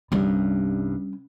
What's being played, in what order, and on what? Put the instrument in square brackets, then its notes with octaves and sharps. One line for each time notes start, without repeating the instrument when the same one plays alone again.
[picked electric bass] C2 G2 [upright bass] G3 C#4